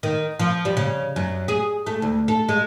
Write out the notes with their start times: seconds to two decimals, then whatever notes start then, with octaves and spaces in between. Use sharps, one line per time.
0.03 D#3
0.39 F3
0.65 G3
0.77 C#3
1.16 F#2
1.48 G#4
1.86 A3
2.02 D2
2.28 A4
2.49 G#3